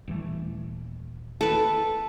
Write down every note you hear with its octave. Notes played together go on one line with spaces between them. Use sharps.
D#1 E3 A3
A4 B4